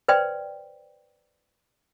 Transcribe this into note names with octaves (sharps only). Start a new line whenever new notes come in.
B4 C5 D5 G5 C6